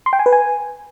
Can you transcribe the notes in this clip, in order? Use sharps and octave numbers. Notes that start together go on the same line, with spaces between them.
C6
G5
G#5
B4
G#5